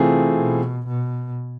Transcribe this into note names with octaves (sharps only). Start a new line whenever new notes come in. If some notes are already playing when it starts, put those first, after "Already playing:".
Already playing: C3 E3 A3 C4 F4 G#4
B2
B2